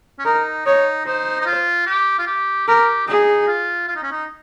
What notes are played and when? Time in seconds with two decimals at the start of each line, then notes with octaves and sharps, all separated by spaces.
0.19 C#4
0.25 D#4 A#4
0.66 D#4 C#5
1.06 D#4 C5
1.41 D#4
1.46 F4
1.86 G4
2.19 F4
2.27 G4
2.68 G4 A#4
3.07 D#4 G#4
3.47 F4
3.88 F4
3.96 D#4
4.03 C#4
4.12 D#4